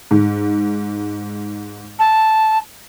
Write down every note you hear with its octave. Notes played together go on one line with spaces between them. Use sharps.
G#2
A5